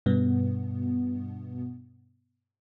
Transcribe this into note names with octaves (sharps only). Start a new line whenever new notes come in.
G2 B2 B3